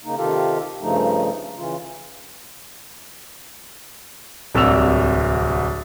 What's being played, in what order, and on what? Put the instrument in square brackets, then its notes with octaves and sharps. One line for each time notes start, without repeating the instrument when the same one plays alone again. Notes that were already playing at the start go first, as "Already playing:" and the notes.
[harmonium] C#3 A#3 D#4
C3 D#3 F4 G4 A4 F5
G2 C#3 F3 A3 D#4
C#3 E3 F4
[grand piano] D1 C2 C3 E6 E7 F7